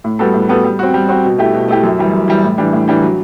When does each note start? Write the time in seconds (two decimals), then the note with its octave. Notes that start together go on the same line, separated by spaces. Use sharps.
0.04 A2
0.19 G3 B3 F#4 A4
0.34 A2
0.49 G3 B3 F#4 A4
0.64 G3
0.79 C4 F#4
0.94 G3
1.09 C4 F#4
1.24 B2
1.38 A3 E4 G4
1.54 B2
1.68 A3 E4 G4
1.83 F#2
1.99 E3 G3
2.13 F#2
2.28 E3 G3
2.43 A2
2.58 E3 G3 D4
2.73 A2
2.88 E3 G3 D4
3.02 F#3